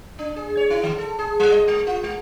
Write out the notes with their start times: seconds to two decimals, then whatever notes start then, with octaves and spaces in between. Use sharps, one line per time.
0.19 D4
0.36 G#4
0.57 C#5
0.70 E4
0.83 D#3
0.98 A4
1.19 G#4
1.40 G3
1.52 D#5
1.67 G#3
1.87 F4
2.03 G#3